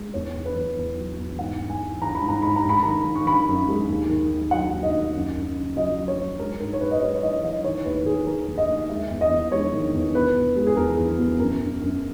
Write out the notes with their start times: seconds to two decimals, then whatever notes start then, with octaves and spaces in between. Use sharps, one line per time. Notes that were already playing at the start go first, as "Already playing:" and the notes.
Already playing: G#3
0.14 E2 C#5
0.35 E2
0.45 B4
0.56 E2
0.77 E2
0.97 F#3
1.18 E2
1.39 G#2 F#5
1.60 G#2
1.70 G#5
1.81 E3
2.02 E3 A#5
2.15 B5
2.22 G#2
2.28 A#5
2.42 G#2 B5
2.56 A#5
2.64 G#3
2.69 B5
2.83 D#3 A#5
3.05 D#3
3.16 C#6
3.26 D#3 B5
3.48 F#2
3.68 G#3
3.89 D#2
4.09 D#3
4.31 D#3
4.51 F#3 F#5
4.73 D#2
4.83 D#5
4.93 D#2
5.14 F#2
5.35 F#2
5.55 C#3
5.76 F#3 D#5
5.97 F#3
6.08 C#5
6.18 F#3
6.39 G#3 A#4
6.60 G#2 A#4
6.73 C#5
6.81 G#2 B4
6.91 D#5
7.02 G#3 C#5
7.22 E3 D#5
7.43 E3 D#5
7.64 D#3 C#5
7.85 D#2 B4
8.06 D#2 G#4
8.27 D#3 A#4
8.48 D#2
8.58 D#5
8.68 D#2
8.89 G#3 E5
9.11 E2
9.21 D#5
9.31 E2
9.52 G#3 C#5
9.73 D#3
9.94 E2
10.15 B2 B4
10.36 B2
10.56 G#3
10.67 G#4
10.77 E2 A#4
10.98 E2
11.18 B2
11.39 F#2 A#4
11.61 F#2
11.81 F#2